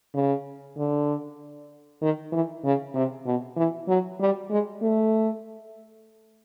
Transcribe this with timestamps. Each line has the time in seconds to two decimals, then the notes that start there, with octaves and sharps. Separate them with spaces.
0.14 C#3
0.77 D3
2.02 D#3
2.32 E3
2.64 C#3
2.94 C3
3.26 B2
3.57 E3
3.88 F#3
4.20 G3
4.50 G#3
4.82 A3